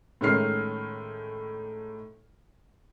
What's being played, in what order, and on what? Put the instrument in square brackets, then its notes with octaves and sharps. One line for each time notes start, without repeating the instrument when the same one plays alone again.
[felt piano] A2 D#3 G#3 C#4 F6 C7